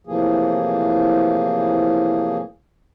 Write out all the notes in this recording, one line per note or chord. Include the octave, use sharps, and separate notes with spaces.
A2 C3 E3 F3 A#3 G#4